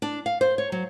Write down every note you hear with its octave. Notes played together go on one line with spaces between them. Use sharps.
D4
F5
C5
C#5
F#3